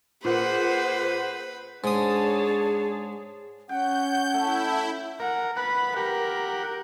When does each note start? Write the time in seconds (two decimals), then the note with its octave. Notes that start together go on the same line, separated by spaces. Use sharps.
0.25 A#2 G#4 B4 C5 F#5
1.84 G#2 D4 G#4 C#5 A5 D#6
3.69 C#4 F#5 G5 G6
4.34 A3 E4
5.20 A#4 F#5
5.57 B4 F#5 B5
5.97 G4 A#4 F#5